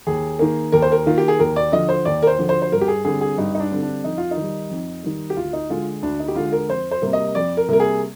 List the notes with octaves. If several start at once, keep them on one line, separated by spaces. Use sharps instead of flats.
D#2 G#4
D#3 A#3
D#2 A#4
C5
A#4
D#3 A#3 F4
G4
G#4
D#2 A#4
D5
D3 F3 D#5
C5
D#2 D5
A#4
C5
D3 F3
C5
C5
G2 A#4
G4
G#4
D3 G3 C4 G#4
G#4
G2 D#4
D#4
D4
D3 G3 C4
D4
F2 D#4
F4
D#4
D#3 G3
F2
D#3 G3
G4
D2 F4
D#4
D3 G#3 F4
D2 D4
D#4
G4
D3 G#3 F4
A#4
F2 C5
C5
C3 G3 A#3
D#5
F2 D5
A#4
C3 G3 A#3 A#4
G#4